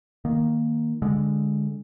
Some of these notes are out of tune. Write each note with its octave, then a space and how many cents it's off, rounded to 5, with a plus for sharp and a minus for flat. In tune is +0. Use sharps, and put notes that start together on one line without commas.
D#3 +0 A#3 +0
D3 -15 G#3 -20